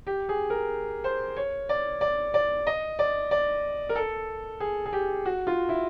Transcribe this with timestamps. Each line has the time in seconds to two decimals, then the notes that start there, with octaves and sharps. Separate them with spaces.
0.07 G4
0.29 G#4
0.50 A#4
1.04 C5
1.36 C#5
1.69 D5
2.01 D5
2.34 D5
2.67 D#5
2.99 D5
3.31 D5
3.89 A#4
3.95 A4
4.60 G#4
4.86 G#4
4.93 G4
5.25 F#4
5.47 F4
5.69 E4